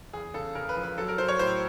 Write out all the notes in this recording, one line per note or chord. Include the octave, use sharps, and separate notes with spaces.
E2 G#4
C#3 A4
C#3 A#4
B4
F3
B4
F#3 A4
A#4
F#3 C5
C#5
A2 C5